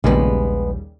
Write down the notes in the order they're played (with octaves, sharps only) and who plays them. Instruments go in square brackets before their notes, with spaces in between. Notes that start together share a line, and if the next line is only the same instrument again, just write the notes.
[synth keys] A#1 [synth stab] D#2 C#3 G3 [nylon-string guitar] G#3 B3